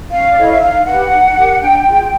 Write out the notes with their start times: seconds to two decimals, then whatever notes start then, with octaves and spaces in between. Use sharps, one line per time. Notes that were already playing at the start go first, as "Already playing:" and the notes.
0.11 C#4 F5
0.30 D5
0.37 E4 A4 C#5 D#5
0.52 E5
0.61 D#4 F5
0.86 G4 B4 F#5
1.11 D#4
1.36 G4 A#4
1.61 D4 G5
1.87 F4 G#4